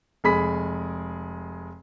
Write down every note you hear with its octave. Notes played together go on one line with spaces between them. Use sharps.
F1 G#3 G#4 B5 B6